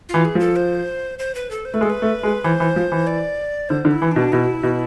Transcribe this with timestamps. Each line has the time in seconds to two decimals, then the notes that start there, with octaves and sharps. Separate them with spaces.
0.09 E3 F4
0.25 G#4
0.35 F3 A4
0.56 C5
1.19 C5
1.35 B4
1.51 A4
1.65 C5
1.74 A3 B4
1.81 G#3 A4
1.90 B4
2.02 A3
2.23 G#3
2.44 E3 C5
2.60 E3
2.76 F3
2.92 E3
3.07 D5
3.69 D3 C5
3.85 D3
3.91 E4
4.02 E3
4.11 B2 D4
4.32 B2 E4
4.63 B2